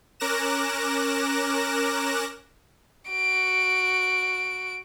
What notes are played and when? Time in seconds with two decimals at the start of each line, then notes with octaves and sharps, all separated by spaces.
0.20 C#4 A#4 D6 F#6 A#6 E7
3.09 F#4 D7